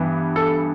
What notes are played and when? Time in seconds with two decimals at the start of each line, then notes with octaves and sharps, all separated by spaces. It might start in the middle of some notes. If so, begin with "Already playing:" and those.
Already playing: G2 E3 B3
0.36 A4